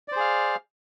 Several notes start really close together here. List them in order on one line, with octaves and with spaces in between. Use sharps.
D5 C5 G#4 F5